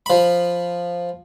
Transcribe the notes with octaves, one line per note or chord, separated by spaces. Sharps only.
F3 B5